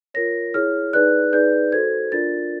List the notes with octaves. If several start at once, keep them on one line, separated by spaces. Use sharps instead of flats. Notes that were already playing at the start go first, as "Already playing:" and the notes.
F4 A#4 C#5 A#6
E4 G#4 C#5 F6
D#4 G#4 B4 D5 F#6
D#4 G#4 B4 D5 G6
F#4 A4 C5 G#6
D4 F4 A#4 D5 A6